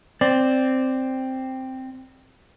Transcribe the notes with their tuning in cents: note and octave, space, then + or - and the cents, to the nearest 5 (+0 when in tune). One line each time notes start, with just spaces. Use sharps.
C4 +0 D5 +0